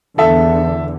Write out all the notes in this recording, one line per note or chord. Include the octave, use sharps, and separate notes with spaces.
E2 D3 A4 E5